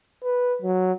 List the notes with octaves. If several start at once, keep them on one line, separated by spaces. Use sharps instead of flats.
B4
F#3